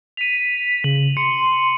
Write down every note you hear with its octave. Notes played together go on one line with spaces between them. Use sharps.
B6 D#7 F7
C#3 F#7
C6 C#7